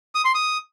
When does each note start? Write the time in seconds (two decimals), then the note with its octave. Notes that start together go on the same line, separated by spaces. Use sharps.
0.15 D#6
0.25 C6
0.35 D#6